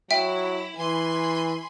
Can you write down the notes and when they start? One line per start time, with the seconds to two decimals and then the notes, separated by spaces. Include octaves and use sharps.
0.11 F#3 E4 E5 G5
0.78 E3 G#5 B5 C6